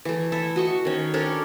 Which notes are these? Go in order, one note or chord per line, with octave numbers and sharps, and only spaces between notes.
E3 A3
A3 E4 A4 E5
F#4 D#5 C#6
D#3 C#4
C#4 D4 A4 A#4